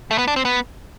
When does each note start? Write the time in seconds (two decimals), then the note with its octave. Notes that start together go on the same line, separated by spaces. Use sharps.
0.11 A3
0.18 B3
0.28 D4
0.36 C4
0.45 B3